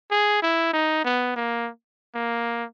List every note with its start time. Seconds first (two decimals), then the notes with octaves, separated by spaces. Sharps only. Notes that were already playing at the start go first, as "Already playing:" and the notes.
0.11 G#4
0.42 E4
0.73 D#4
1.05 B3
1.36 A#3
2.15 A#3